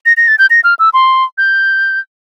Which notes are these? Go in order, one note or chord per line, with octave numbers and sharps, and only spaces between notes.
A#6
A#6
A6
G6
A#6
F6
E6
C6
G6